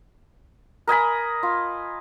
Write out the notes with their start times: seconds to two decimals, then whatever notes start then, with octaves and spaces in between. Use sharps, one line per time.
0.87 A#4 D#5 G#5 B5
1.43 F4